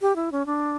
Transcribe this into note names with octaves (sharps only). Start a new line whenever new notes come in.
G4
E4
C#4
D4